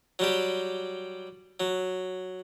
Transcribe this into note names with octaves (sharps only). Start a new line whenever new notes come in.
F#3 G3 G4
F#3